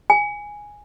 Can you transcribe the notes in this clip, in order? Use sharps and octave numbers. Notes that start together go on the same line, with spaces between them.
G#5